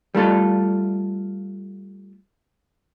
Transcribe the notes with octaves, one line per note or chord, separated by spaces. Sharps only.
G3 A3 F4 A4